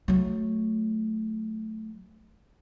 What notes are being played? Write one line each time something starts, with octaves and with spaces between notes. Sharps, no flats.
F#3 A3